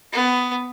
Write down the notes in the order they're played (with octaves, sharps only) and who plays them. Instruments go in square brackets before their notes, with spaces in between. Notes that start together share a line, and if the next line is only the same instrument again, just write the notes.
[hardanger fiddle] B3